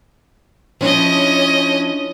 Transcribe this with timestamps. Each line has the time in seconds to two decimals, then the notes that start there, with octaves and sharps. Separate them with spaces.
0.81 F3 C#4 D4 E4 D#5